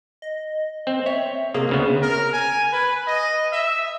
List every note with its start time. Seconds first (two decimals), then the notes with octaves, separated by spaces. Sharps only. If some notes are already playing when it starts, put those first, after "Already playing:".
0.22 D#5
0.87 C4
1.06 C#5 E5
1.54 C3 A#3 G#4
1.69 D2 C#3 B3
2.02 A#4
2.33 G#5
2.73 B4
3.08 D#5
3.53 E5